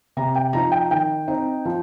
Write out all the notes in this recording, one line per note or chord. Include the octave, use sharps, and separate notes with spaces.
C3 A#5
G5
F3 D#4 A#5
G5
D#3 G5
C4 D#4
F3